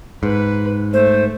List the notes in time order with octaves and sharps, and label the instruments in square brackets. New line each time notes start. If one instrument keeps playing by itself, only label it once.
[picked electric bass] G#2 [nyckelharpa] B4
[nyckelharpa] A3 [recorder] C5